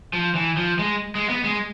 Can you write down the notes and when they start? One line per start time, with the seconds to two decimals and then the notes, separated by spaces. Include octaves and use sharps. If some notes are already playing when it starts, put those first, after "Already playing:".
0.13 F3
0.35 E3
0.57 F3
0.79 G#3
1.15 G#3
1.30 B3
1.44 G#3